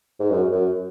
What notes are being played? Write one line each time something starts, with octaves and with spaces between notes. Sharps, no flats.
G#2
F#2
F#2